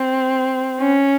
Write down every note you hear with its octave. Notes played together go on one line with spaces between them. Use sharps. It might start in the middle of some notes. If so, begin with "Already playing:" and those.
Already playing: C4
C#4